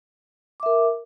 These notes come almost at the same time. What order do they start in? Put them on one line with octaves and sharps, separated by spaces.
D6 E5 A#4